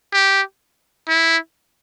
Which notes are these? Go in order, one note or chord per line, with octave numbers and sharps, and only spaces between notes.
G4
E4